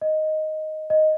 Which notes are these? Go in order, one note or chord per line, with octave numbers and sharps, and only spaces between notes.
D#5
D#5